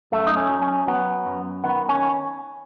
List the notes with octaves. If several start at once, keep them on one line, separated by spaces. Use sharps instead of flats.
F#2 A3
D#4
C#4
F#3
C#4
F#3 B3
F#2
D#3 B3
C#4